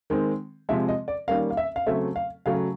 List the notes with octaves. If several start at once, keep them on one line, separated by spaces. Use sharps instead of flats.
D#3 G#3 C4
C3 F3 G#3 E5
D#5
D5
D#3 G3 A#3 C#4 F5
F5
E5
F5
C#3 F#3 A3 C4 E5
F5
C#3 F#3 A3 F5